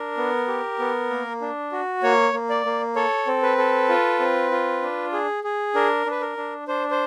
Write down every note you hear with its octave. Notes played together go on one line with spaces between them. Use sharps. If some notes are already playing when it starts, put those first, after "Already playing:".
Already playing: D4 A#4
B3
G4
B3
A#3
D4
F#4
A#3 C#5
A#3
D5
A#3
A4 C#5
C4
B4
A4
F4
C4
F4
D4
G#4
G#4
D4 A#4
D4 B4
A#4
D4
D4 C5
C5